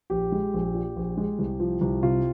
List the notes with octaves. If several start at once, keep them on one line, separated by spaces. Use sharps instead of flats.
A#1 G4
G#3
A#1
A#2
A#1
G#3
C2
F3
C2
C3 F4